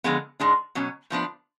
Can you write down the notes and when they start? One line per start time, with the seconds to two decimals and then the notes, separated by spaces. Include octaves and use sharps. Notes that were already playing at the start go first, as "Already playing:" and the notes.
0.04 D3 F3 G#3 B3
0.40 G#2 G#3 D4
0.75 B2 F#3 C#4
1.10 A2 F3 B3 D4